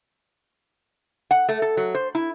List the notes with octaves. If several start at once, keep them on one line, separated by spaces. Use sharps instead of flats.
F#5
A3
A4
F#3
C5
E4